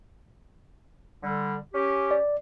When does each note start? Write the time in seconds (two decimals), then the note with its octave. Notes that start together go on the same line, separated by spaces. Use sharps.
1.23 D3 G3
1.73 C#4 G4
2.11 D5